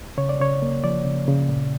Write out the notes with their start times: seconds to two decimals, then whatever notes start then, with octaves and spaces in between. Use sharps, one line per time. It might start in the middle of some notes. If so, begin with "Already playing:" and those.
0.18 C#3 C#5
0.29 D5
0.40 C#3 C#5
0.62 A#3
0.84 F3 D5
1.05 C#3
1.28 C#3
1.49 A#2